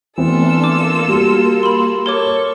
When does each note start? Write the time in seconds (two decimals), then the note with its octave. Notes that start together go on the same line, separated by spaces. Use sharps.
0.18 E3 A3 B3 C4 D4 F4 A4 E6
0.64 A#3 D6
1.09 G3 F#4
1.63 B5 C6
2.06 A4 A#4 C#5 C#6 D6